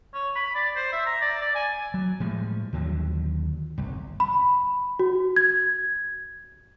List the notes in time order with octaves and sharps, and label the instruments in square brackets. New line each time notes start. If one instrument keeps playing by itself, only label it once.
[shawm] C#5
B5
D5
C5
E5
A#5
D5
D5
G#5
[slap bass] F#3
A2 F3 G3 G#3
D#2 D3 F3 F#3
G1 C2
[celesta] B5
F#4
G#6